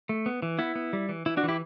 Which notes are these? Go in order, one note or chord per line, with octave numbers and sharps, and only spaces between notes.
A3
B3
E3
B3 E4
B3
G3
E3
E3 E4
D4 F#4
E3
E4 G4